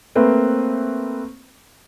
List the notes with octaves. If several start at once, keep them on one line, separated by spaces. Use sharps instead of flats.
A3 A#3 C4 B4 C5